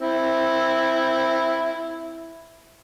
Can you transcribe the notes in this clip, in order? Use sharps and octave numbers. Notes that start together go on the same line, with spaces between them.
C4 E4